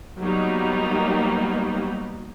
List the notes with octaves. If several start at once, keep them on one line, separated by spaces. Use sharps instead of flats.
F#3 G3 A#3 B3 D#4